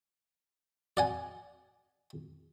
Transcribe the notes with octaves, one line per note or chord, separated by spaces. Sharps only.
D5 F#5 G#5